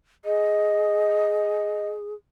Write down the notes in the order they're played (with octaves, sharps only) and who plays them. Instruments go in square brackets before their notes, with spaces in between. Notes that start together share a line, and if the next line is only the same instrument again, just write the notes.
[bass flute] G#4 [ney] D#5